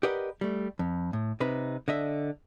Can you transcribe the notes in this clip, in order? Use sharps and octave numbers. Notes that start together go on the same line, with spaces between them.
G4 A#4 B4 D5 D#5 F#5
G3 A3
F2
A2
C3 D#4 B4
D3 D#5 E5